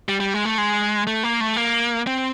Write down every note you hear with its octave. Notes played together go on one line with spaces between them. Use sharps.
G3
G3
G#3
A3
G#3
A3
A#3
A3
A#3
C4